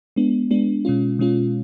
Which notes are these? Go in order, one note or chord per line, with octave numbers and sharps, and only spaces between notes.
G#3 B3 D4
G#3 B3 D4
B2 G#3 C#4 F4
B2 G#3 C#4 F4